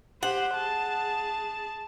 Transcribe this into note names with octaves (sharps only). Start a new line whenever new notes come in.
G4 C5 F#5
G#4 A5